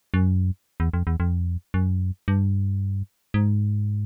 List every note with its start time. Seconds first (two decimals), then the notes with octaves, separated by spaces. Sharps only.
0.14 F#2
0.80 E2
0.93 F2
1.07 E2
1.20 F2
1.74 F#2
2.28 G2
3.34 G#2